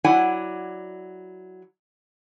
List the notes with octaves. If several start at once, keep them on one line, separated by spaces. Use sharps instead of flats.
F#3 E4 D5 F#5 G#5